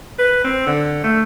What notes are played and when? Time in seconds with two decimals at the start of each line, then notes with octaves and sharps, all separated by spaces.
0.19 B4
0.44 C4
0.67 D3
1.04 A3